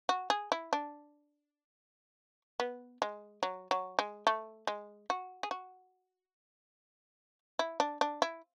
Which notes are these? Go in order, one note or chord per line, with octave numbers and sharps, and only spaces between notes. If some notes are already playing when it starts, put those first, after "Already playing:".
F#4
G#4
E4
D4
B3
G#3
F#3
F#3
G#3
A3
G#3
F#4
G#4
F#4
E4
D4
D4
E4